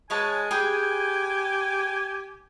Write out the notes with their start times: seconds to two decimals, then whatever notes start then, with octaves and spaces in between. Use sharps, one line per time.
0.10 G#3 B4 C#5 G#5 A5
0.51 G4 G#4 B4 G5